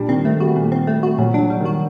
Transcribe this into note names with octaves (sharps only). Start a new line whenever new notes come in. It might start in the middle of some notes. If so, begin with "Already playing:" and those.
Already playing: A#2 G3 D4
D#3 C4
D#3 A3
G3 F#4
A#2
C4
A3
F#4
A#2 F#3
F#3 D4
G3
D#3
F#4